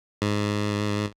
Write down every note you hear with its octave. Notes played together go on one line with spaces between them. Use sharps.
G#2